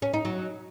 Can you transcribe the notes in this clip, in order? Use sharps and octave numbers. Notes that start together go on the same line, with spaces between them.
C#4
D#4
F#3